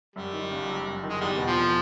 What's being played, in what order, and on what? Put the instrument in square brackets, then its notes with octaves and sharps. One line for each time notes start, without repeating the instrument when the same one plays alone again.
[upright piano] F#2 [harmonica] G3
[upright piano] D#3
F#1
F#3
F#2
D#3
[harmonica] G#3
[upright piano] E2 [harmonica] G3
[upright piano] B2
[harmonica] F3
[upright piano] F1